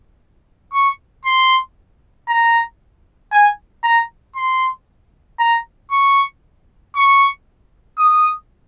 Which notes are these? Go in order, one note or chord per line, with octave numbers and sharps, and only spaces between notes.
C#6
C6
A#5
G#5
A#5
C6
A#5
C#6
C#6
D#6